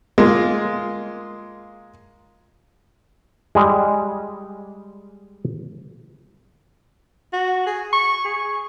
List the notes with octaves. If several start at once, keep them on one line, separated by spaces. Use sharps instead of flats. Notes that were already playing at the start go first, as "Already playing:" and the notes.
G#3 A#3 F4
G3 G#3
F#4
G#4
C#6
G#4